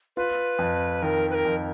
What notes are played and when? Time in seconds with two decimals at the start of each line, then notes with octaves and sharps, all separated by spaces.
0.16 F4 B4
0.59 F2
1.02 D#3 A#4
1.30 B4
1.34 A#4
1.45 F2